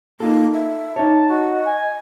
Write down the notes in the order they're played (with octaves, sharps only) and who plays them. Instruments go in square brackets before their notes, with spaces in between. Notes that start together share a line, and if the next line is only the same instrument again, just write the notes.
[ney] A#3 [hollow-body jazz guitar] D#4 F4 A4
[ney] E5
[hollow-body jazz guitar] D#4 C#5 [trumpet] A5
[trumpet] F#4 [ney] D#5
[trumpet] G#5